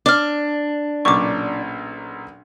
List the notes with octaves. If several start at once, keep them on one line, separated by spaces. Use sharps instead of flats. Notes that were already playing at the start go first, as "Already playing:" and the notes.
D4 D6 F6
B1 A#2 C#3 C#6 D6